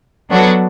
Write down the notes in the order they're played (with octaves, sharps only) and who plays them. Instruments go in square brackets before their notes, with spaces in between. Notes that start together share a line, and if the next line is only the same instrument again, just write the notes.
[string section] F#3 B3 D4 F#4 A4